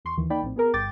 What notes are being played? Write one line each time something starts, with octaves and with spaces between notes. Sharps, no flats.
E2 C6 C#6
D#2 D#3 E3
A#3 D#4 D5 G5 B5
A#1 A2 C4
B3 G#4 A#4 A#5
G1 G2 G5 D6 G6 A6